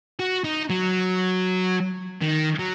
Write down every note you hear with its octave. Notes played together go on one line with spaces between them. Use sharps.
F#4
D#4
F#3
D#3
F#3